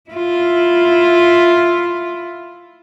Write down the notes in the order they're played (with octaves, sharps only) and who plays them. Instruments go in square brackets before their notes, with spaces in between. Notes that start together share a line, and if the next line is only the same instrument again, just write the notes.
[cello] E4 F4